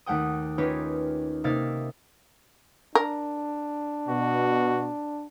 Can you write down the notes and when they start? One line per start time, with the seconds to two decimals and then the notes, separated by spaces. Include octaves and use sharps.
0.06 D#2 A3 F#5 G5 D#6
0.58 C#4 D#4 F4 G4 B4 C#5
1.44 C3 A#3 D#4 E5 F5 A6
2.95 D4 A#4
4.09 B2 F#4